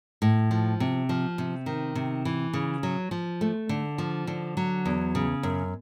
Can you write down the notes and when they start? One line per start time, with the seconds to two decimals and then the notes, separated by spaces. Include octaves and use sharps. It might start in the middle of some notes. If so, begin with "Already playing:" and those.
0.22 A2
0.51 F3
0.80 C3
1.09 F3
1.38 C3
1.66 D#3
1.95 C3
2.25 E3
2.53 C#3
2.83 F#3
3.11 F3
3.41 A3
3.69 D3
3.98 F3
4.27 D3
4.57 F#3
4.86 E2
5.15 C#3
5.43 F#2